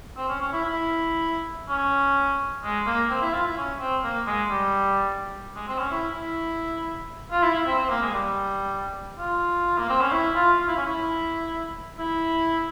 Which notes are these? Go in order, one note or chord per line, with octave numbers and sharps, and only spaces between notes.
C4
C#4
C#4
E4
E4
C#4
G#3
A#3
C4
E4
F4
E4
C#4
C4
A#3
G#3
G3
G#3
C4
C#4
E4
E4
F4
E4
E4
C4
C4
A#3
G#3
G3
F4
A#3
C4
C#4
E4
F4
F4
E4
C#4
E4
E4